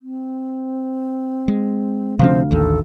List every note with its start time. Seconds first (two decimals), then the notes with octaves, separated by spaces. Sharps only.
0.01 C4
1.48 G#3
2.19 D2 C3 F3 C4 C5 F5
2.51 A1 D#2 D#3 A4